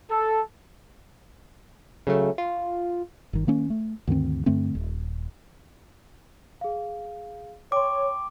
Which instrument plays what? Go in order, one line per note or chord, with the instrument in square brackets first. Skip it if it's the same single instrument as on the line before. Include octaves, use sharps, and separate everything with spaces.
[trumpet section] A4
[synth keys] C#3 F#3 A3
F4
[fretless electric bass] G1 D#3
D#3 A#3 C#4
A3
D2 G2 D#3 C4
G2 D3 A3 C4
D#1
[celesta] G#4 F5
[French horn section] C#5 [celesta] G5 C6 [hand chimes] D6